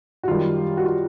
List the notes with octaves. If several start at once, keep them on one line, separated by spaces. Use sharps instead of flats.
F#4
F#2 D#3 G3 F4
F#4
F4